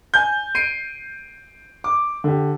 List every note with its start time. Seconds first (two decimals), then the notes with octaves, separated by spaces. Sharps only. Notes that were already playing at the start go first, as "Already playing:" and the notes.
0.14 G#5 G6
0.55 C7 D7 D#7
1.84 D6
2.24 D3 G4